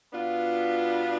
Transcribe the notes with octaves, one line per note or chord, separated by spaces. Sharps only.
B2 B3 D4 F4